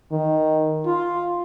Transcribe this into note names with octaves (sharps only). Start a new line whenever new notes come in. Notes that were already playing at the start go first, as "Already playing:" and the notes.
D#3
F4